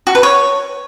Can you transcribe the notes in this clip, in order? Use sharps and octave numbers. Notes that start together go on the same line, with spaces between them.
F#4
B4
C#5